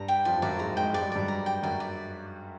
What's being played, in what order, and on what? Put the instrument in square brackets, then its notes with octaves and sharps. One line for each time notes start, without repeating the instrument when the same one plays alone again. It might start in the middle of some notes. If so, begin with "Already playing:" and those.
Already playing: [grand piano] G2 G3 [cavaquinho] A#5
[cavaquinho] G5
[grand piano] F2 F3 [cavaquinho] D5
[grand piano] F3
[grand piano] F#2 F#3 [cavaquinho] D5
[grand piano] G#2 G#3 [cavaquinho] A#5
[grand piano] G#2 G#3 [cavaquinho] G5
[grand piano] G#3 [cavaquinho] D5
[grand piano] G3
F#3
[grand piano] G2 G3 [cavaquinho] D5
[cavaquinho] A#5
G5
[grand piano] F#2 F#3 [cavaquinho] D5
[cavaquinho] D5